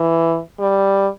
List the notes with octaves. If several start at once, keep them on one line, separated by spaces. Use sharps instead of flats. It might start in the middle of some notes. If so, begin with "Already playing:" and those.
Already playing: E3
G3